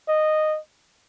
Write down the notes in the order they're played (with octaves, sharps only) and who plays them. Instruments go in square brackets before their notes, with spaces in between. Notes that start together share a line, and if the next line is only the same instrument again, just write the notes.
[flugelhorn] D#5